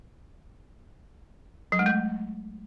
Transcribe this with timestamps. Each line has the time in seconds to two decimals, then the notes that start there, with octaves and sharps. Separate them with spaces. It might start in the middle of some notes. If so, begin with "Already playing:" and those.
1.72 F#3
1.79 G#3
1.86 A3